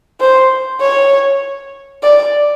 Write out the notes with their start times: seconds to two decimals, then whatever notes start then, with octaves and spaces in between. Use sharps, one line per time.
0.20 C5
0.81 C#5
2.03 D5